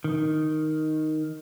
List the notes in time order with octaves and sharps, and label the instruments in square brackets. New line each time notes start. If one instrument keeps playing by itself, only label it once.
[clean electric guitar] D#3